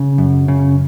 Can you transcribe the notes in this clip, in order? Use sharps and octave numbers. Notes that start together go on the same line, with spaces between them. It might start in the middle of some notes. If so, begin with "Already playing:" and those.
Already playing: C#3
F#2
C#3